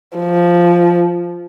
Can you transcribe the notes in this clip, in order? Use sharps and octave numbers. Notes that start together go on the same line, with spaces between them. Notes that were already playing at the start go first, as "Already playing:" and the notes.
F3